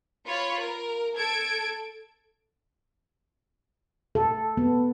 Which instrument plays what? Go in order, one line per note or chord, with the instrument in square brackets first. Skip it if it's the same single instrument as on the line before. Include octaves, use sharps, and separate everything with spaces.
[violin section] F4 C#5 B5
A#4
A4 G#6 D7
[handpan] A4
B3